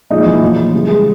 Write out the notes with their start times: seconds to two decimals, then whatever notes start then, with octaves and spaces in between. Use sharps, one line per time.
0.10 A#2 F3 G#3 D#4
0.26 E3 E4
0.41 A#2 F3 F#3 F4
0.73 C#3 E3 G3
0.88 G#3 G#4